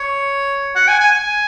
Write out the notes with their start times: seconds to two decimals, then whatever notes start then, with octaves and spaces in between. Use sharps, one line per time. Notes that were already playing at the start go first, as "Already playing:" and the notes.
Already playing: C#5
0.76 F#5
0.88 G#5
1.00 G#5
1.11 G#5